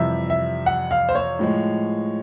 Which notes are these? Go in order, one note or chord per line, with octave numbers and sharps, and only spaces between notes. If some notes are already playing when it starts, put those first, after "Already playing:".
Already playing: F2 C3 E3 G3 E5
E5
F#5
F5
C5
C#5
A2 F3 G#3